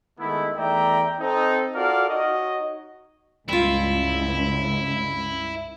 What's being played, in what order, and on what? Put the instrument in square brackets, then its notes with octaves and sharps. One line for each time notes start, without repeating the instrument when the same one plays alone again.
[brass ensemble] D#3 G#3 A3 B3 E4
E2 A3 D5 E5 G5 A#5
C4 D#4 A4
F4 F#4 A4 A#4 D5 F5
D#4 F#4 C#5 D#5
[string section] C#2 [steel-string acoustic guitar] G2 F4 [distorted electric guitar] E4